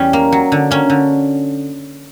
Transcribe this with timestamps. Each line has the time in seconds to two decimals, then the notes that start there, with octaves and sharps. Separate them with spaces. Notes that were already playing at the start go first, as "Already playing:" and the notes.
Already playing: E2 G3 C#4
0.13 A#3
0.32 F#3
0.52 D3
0.71 A#3 C#4
0.90 D3